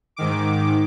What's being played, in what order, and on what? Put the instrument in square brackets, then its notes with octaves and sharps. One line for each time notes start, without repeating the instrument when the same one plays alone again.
[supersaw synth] G#2 D#3 D6